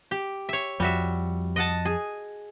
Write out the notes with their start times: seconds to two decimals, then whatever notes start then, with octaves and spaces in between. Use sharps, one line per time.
0.11 G4
0.49 C#5 E5
0.80 F2 G3 F#4 E5
1.56 D#5 F#5 A5
1.85 G#4